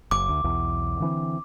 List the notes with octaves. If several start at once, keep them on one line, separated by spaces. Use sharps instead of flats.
F#1 D6
D2
B1 E2
D3 E3 C4